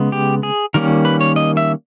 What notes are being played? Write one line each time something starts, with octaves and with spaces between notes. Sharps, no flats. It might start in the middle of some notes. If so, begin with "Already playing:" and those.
Already playing: C#3 G#3 B3
G4
G#4
D#3 G3 A#3 C#4 A#4
B4
C#5
D#5
E5